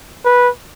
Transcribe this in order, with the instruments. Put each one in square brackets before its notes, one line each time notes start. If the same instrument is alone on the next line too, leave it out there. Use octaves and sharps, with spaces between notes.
[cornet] B4